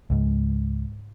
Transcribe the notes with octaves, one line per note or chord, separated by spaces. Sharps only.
C#2 G#2